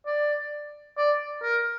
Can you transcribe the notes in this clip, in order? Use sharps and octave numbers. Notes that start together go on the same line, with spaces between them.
D5
D5
A#4